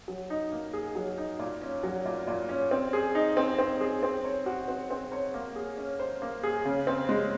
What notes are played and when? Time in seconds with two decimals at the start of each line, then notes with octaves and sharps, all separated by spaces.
0.08 F#3
0.30 D#4
0.52 A#3
0.73 G#4
0.95 F#3
1.18 D#4
1.39 A#2
1.62 C#4
1.83 F#3
2.06 A#2
2.27 A#2
2.49 C#4
2.71 C4
2.93 G#4
3.15 D#4
3.37 C4
3.59 C4
3.81 G#4
4.03 C4
4.25 C#5
4.46 F#4
4.68 C4
4.90 C4
5.12 C#5
5.34 A#3
5.56 G#4
5.77 C#4
6.00 C5
6.22 A#3
6.43 G#4
6.65 C#3
6.87 C4
7.09 G#3